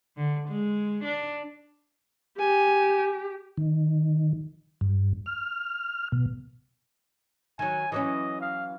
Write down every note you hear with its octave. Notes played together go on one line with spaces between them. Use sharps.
D3
G#3
D4
G4 G#5
D#3
G2
F6
B2
D#3 F#3 G#5
E3 F#3 C#4 D#5
F5